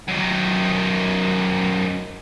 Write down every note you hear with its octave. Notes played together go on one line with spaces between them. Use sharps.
F#2 D#3